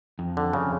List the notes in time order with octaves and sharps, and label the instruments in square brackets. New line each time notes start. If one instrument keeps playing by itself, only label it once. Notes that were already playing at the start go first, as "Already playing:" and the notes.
[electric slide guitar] F2
[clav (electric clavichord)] D3
[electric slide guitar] F2 [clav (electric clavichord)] C#3